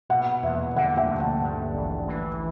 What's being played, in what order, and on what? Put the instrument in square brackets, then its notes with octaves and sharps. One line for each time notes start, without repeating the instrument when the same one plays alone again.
[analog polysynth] B2 [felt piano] F#5
[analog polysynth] E2 [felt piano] E5
[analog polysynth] D3 [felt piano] F#5
[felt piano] E5 G5
[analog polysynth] D2
[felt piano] F#5 A5
[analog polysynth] G2
A1
E3